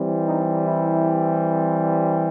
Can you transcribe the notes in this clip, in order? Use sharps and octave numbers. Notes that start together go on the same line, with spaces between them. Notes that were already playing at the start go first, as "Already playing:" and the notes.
Already playing: E3 G3 C4
D#4
E4